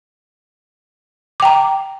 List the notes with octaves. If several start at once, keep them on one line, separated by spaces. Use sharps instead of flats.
G5 A#5 D6